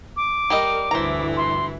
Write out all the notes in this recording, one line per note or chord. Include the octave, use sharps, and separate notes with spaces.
D6
G3 G4 A#4 D#5
D2 G2 E3 E4 C5 A#5
C6